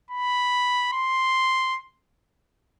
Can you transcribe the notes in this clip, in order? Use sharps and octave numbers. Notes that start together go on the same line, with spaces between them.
B5
C6